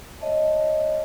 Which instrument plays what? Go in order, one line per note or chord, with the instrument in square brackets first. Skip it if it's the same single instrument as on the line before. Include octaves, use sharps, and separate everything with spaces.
[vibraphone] C#5 D#5 E5 A5